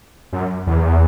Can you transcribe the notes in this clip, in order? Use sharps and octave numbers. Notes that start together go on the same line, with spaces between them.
F#2
E2